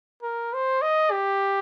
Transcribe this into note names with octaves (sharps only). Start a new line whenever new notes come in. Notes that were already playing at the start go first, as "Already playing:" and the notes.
A#4
C5
D#5
G4